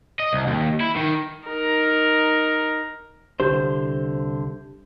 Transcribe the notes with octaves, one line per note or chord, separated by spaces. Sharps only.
D#5
C2
D#2
E4
D#3
D#4 A#4
C2 D3 G4 C5 G6